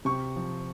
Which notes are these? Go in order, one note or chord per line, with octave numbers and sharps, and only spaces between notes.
C3 C#6
F3